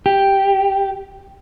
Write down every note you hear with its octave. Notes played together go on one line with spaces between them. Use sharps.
G4